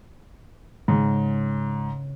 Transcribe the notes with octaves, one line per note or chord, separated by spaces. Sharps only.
G#2 C#3 A#6 C#7